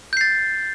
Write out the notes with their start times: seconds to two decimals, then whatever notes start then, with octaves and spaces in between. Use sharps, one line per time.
0.13 G6
0.17 C7
0.21 A6